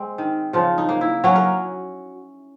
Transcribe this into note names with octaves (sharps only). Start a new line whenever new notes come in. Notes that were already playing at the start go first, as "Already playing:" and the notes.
Already playing: G#3 C4
D#3
C#3 F3 F4
D#4
A#3
E4
F#3 C#4 F#4
A#4